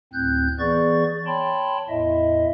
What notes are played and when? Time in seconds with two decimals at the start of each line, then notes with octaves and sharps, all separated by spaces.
0.13 D2 A2 C4 F#6 G6
0.59 E3 B3 G#4 D5 C#6 A6
1.27 C#5 G5 A5 B5 C6
1.89 E2 A2 E4 D#5 E5